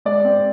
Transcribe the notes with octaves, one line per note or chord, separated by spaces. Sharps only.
G#3 D5
C4